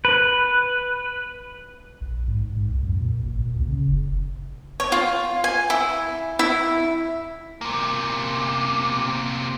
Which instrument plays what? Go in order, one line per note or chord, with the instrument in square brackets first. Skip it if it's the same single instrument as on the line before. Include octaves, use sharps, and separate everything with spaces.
[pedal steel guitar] B4
[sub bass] A#1
G#2
G#2
C2
F#2
A#2
A1
A#2
C#2
C#3
F#1
[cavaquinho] C#5
F4
G#5
E4
E4
[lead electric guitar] C3 A#3